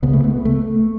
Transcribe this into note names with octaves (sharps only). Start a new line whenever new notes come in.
C#2 C#3 B3
A3
B3
A3